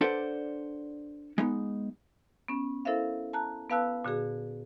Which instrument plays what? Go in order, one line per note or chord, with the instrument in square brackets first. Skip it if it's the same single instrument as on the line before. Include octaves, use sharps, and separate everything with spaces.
[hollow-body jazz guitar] D4 A4 B4 C5 D5 F#5
G#3 B3 D#4
[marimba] B3 C#4
E4 A4 A#4 C5 E5 F5
A5 A#5 F#6
B3 B4 F5 A5 E6 F#6
A#2 D3 F#4 G#4